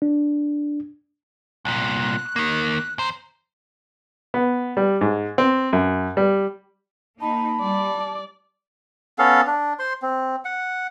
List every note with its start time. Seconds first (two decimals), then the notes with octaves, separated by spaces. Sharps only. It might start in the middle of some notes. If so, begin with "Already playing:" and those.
0.02 D4
1.65 C2 A#2 F#6
2.36 D#3 A#3
2.98 E2 C5 A#5
4.34 B3
4.77 G3
5.01 G#2
5.38 C4
5.73 F#2
6.17 G3
7.21 A#3 D#4 A5 B5
7.61 G3 D5
9.18 B3 C#4 A4 F5
9.47 D4
9.79 C5 C6
10.02 C4
10.45 F#5